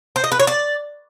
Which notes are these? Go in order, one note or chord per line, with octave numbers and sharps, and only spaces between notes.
C5
D#5
B4
C#5
D5